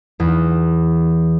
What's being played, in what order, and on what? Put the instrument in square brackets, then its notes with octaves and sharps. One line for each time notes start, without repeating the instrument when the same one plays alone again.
[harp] E2